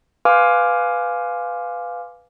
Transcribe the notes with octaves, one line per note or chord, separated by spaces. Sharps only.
B4 F5 G#5 C6 D6 F6